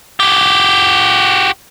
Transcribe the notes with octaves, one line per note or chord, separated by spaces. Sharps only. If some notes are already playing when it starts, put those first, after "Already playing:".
F#4 G4